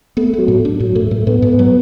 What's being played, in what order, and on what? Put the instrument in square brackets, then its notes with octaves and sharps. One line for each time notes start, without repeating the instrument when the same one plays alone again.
[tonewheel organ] A3 [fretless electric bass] B3
[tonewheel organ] F#3 [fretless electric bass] B3
[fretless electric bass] A2
D4
[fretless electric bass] A2 [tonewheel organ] F#3
[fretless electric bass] A2 [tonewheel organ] A3
[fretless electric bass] A2 [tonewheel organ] A3
[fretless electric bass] A2 [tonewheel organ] B3
[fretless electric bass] G#2
F#3